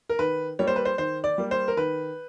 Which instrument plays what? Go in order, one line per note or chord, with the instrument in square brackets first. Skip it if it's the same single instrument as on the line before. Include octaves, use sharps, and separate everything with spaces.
[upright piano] A#4
D#3 B4
G3 A#3 C#5
C5
B4
C5
D#3 C5
D5
G3 A#3
C5
A#4
D#3 B4